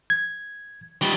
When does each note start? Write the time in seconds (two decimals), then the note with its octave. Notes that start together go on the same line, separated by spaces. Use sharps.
0.10 G#6
1.01 D#3 G3